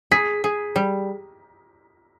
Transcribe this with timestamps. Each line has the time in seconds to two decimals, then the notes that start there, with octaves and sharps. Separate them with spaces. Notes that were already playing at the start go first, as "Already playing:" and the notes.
0.11 G#4 B6
0.44 G#4
0.76 G3